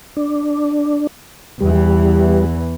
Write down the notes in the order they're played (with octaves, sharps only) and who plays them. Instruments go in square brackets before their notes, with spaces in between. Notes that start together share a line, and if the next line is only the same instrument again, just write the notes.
[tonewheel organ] D4
[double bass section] E2 E3 [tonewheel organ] G3